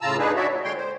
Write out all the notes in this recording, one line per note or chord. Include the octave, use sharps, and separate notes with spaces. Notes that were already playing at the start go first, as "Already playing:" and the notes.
A2 C#3 F4 A5 A#5 E6
D4 D#4 G#4 B4
F#4 C#5 D5 E5
A#2 F#3
D3 G#3 C#5 G5 C6
C5